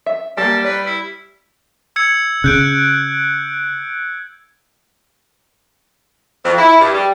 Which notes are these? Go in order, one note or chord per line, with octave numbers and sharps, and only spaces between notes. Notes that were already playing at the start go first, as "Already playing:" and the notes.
E5
G3 G#3 A#3 A5
B4 D5
E4
E6 G#6 C#7
C#3 F#6 G6 D7
F2
E4
G2
G3